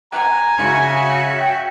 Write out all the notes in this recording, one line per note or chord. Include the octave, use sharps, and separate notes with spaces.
G#5 A#5
C#3 F#4 E5
G5